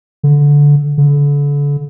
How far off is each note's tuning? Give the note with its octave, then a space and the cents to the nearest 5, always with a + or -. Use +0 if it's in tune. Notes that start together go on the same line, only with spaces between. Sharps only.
D3 -15
D3 -35